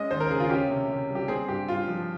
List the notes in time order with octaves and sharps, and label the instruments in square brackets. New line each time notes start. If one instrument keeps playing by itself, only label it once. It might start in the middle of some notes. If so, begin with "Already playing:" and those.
Already playing: [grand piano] G#3 C#4 D#5
D#2 C5
A#4
C#3 G#4
F4
C#4 G4
C3
C3
G3
G4
C4 G#4
G2 G4
G2 F4
F3